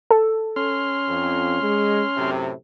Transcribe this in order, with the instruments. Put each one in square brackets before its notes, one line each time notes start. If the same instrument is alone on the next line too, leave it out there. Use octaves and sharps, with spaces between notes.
[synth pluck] A4
[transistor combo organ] C#4 C6 F6
[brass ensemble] F2
G#3
F#2 A2 C3